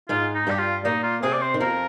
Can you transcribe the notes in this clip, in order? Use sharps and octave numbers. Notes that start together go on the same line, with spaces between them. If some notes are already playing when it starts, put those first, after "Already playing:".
G#2 G#3 F4
D#4
G2 G3 G4
F4
A#2 A#3 D#4
F4
C3 C4 G#4
D5
C5
D#3
F2 F3 A#4